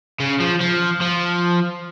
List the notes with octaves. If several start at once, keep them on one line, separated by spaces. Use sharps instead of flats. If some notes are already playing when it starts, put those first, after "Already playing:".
C#3
F3
F3
F3